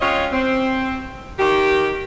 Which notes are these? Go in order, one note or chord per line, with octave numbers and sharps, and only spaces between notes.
G#3 C4 C#4 F4 C#5 D#5
C4
D#3 G4